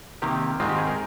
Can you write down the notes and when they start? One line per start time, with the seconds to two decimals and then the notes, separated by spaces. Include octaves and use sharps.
0.22 C3 D#3 A#3 G4
0.60 G#2 D#3 G#3 C4 F4
0.69 G4
0.78 G#4
0.87 A#4